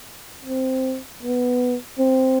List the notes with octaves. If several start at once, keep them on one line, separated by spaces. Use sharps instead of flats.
C4
B3
C4